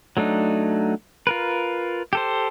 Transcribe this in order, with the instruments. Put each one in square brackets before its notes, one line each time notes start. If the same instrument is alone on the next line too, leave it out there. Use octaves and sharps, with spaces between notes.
[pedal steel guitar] F#3 A3 D4 D#4
F4 A#4 B4
G4 A4 C5